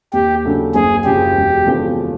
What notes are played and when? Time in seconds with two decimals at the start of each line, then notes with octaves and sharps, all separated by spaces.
0.13 D#2 G4
0.44 C#3 F#3 A3 D4
0.74 F#1 G#4
1.04 F#2 C#3 F3 G4
1.35 E1
1.65 E2 C#3 F3 A3